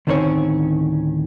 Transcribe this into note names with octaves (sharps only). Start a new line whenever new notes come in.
D2 A2 D#3 C4 C#4 C#5